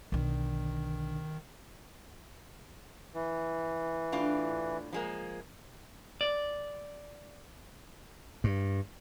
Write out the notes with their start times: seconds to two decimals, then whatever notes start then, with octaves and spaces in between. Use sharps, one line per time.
0.12 B1 D3 D#3
3.14 E3
4.12 A2 D4 F4
4.92 F3 G#3 A#3
6.21 D5
8.44 G2